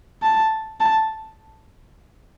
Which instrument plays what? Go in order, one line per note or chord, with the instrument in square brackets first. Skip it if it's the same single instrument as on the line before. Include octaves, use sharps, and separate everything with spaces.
[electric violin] A5
A5